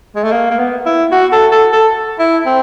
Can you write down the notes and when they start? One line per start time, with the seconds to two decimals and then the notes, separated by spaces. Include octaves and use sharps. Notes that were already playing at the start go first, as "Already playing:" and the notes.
0.15 G#3
0.24 A3
0.32 A#3
0.51 A#3
0.59 B3
0.86 E4
1.12 F#4
1.32 A4
1.52 A4
1.73 A4
2.19 E4
2.46 C4